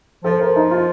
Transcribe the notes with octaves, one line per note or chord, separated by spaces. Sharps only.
F3 A4
F3 A#4
D#4
F4